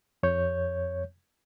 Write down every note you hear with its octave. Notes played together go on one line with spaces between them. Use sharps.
F2 C#5 G6